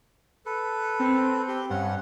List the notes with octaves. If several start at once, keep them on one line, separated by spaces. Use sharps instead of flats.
A4 B4
C4
G4
G2 C#4 F#5